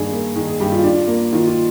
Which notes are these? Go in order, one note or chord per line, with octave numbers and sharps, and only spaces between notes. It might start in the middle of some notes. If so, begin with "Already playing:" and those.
Already playing: G2 D#3 A#3 D4 G#4
A#3
D#3 G#4
G#4
G2 G4
F4
D4
A#3
D#3 F4
F4